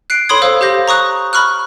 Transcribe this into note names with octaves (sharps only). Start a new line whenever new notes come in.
F#6 C7 D7
A4 C#5 B5 C6 D#6 G#6
A4 C5 F5 E6
G4 C5 F5 G6 A#6
A#5 C#6 D#6 F#6
B5 C#6 F6 F#6